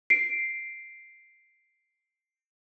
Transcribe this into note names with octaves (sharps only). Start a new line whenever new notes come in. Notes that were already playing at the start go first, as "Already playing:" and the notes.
C7 D7